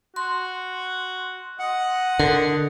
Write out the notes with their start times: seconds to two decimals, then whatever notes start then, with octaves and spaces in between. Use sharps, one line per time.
0.16 F#4 C6
1.59 D#5 F#5
2.19 D3 A#4